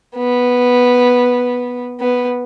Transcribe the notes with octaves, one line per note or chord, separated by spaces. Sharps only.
B3
B3